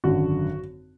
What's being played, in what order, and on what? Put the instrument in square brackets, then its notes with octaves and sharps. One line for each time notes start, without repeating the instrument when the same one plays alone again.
[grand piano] G#1 F#2 D3 F#3 F#4